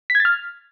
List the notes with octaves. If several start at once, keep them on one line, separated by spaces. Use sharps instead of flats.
B6
G#6
A6
F6